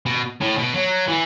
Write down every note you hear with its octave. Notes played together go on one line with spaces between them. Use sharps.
B2
A2
B2
F#3
E3